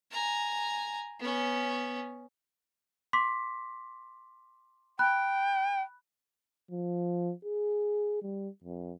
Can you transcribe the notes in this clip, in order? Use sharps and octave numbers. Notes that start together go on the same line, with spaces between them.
G#5 A#5
B3 C#4
C6 D6 B6
G5 B5 F#6
F3
G#4
G3
F2